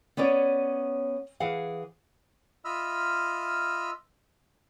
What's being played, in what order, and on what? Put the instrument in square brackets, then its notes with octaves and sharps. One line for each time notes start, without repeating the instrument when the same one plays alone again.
[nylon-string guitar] B3 C#4 C#5 D5
E3 G#4 F5 F#5
[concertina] F4 D#5 E5 B5 E6 F6